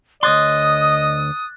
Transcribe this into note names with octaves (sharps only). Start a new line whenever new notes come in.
D2 C#5 D#5 C6 D6 D#6 F#6 A6